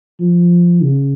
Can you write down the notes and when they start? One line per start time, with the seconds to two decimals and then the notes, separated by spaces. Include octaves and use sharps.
0.20 F3
0.83 C#3